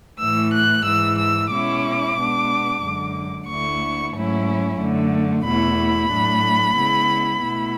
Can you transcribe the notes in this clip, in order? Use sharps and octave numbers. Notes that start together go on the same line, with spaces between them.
A2 E3 A3 E6
F#6
G#2 E3 G#3 E6
E6
B2 G#3 C#4 E4 D6
B2 G#3 B3 D4
F#2 D3 G#3
D2 D3 A3 E4 C#6
G#2 F#3 A3 C#4 E4
F#2 D3 A3
E2 B2 A3 E4 B5
A2 F#3 A3 D4
C#3 G#3 B3 E4
B2 A3 E4